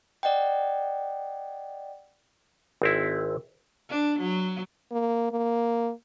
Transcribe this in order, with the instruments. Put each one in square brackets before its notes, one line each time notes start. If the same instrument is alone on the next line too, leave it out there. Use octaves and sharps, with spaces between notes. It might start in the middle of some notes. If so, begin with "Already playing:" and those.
[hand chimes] D5 D#5 F#5 G5
[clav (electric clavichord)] G#1 C4 E4
[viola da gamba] D4
F#3
[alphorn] A#3
A#3